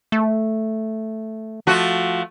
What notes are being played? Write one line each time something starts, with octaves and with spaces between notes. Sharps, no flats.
A3
F3 A3 F#4